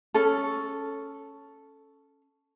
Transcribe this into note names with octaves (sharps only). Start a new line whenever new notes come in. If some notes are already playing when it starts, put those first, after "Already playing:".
C#4 A4